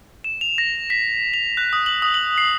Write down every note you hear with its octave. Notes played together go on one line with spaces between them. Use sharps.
E7
F7
A#6
B6
F7
F#6
D#6
F#7
D#6
F#7
C7